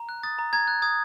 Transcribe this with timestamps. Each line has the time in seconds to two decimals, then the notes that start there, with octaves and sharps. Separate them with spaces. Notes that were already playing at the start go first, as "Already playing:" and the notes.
Already playing: A#5
0.09 F#6
0.23 D#6 A6
0.39 A#5
0.53 A#5 G#6
0.68 F#6
0.82 D#6 G#6